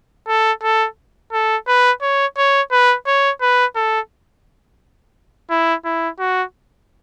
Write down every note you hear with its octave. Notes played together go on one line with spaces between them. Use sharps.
A4
A4
A4
B4
C#5
C#5
B4
C#5
B4
A4
E4
E4
F#4